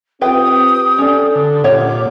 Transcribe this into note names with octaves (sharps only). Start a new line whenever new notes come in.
C4 F4 G4 B4 G5 D#6
C#4 D4 A4
D3
A#2 G4 C#5 F#5 D6